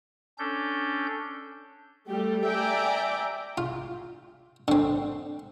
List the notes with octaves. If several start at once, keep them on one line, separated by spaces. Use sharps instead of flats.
C#4 D4 A4 G6
G3 A3 G4
D5 E5 G5 G#5 A#5 D6
F4
D3 C4